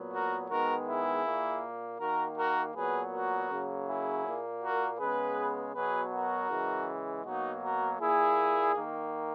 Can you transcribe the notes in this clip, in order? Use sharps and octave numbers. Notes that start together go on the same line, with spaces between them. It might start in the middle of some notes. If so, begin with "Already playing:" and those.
Already playing: A#2 F#3 B3
F#4 A#4
D#3 G#3 B3 F#4 A#4
E4 G#4
A#2 A#3
D#3 A#3 F#4 A#4
F#4 A#4
A#2 F#3 B3 G#4 B4
F#4 A#4
C#3 F#3 A#3
E4 G#4
A#2 A#3
F#4 A#4
C#3 G#3 B3 G#4 B4
B2 F#3 B3 G#4 B4
F#4 A#4
C#3 E3 G#3
B2 F#3 A#3 D#4 F#4
F#4 A#4
A#2 A#3 E4 G#4
D#3 A#3